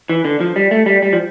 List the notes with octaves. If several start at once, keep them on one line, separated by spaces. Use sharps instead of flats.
E3
D3
F3
G3
A3
G3
G3
F3